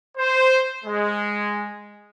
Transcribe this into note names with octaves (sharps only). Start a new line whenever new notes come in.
C5
G#3